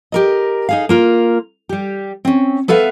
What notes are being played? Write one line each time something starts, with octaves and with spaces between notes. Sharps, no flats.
G4 A#4 D#5
D#4 G#4 F5
A#3 F4 A#4
G3 G4
C4 C#4
B3 A4 B4 E5 F5